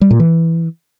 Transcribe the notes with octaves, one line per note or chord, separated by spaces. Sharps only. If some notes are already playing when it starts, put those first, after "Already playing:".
G3
A#2
E3